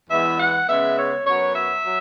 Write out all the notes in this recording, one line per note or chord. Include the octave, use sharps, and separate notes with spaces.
E2 E3 G#3 B3 E5
F#5
C#3 G#3 B3 E5
C#5
F#2 F#3 B3 C#5
E5
F#3